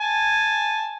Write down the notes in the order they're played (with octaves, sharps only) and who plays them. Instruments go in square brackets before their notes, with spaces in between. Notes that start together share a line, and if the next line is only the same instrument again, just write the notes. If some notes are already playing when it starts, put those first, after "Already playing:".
[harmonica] G#5 A5